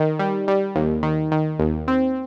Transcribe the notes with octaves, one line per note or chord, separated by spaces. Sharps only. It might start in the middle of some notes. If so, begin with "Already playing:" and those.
Already playing: D#3
G3
G3
D#2
D#3
D#3
D#2
C4